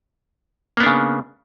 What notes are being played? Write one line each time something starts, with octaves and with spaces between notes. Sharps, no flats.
C#3 A#3 B3 D4